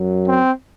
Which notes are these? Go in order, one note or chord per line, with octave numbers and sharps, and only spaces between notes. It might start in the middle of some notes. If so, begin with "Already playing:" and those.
Already playing: F#2 F#3
C4